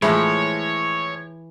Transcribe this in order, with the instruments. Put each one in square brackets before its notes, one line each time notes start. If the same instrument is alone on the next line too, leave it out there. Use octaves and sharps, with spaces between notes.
[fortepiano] A2 F3 G#3 [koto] E3 [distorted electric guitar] C#5